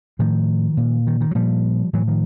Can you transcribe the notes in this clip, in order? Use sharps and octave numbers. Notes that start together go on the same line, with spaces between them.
A2 D#3 F3
A#2
D#3
D#3
F#3
A#2 F3 G3
A2 E3 F#3
D#3 F3